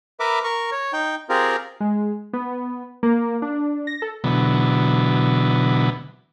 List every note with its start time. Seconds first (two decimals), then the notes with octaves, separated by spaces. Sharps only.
0.20 A#4 B4 E5 D6
0.44 A#4 C#6
0.72 C#5
0.93 D#4 G5
1.29 C4 F4 G4 G#4 A#4
1.80 G#3
2.33 B3
3.03 A#3
3.42 D4
3.87 A#6
4.02 A4
4.24 B2 D3 E3 F#3 B3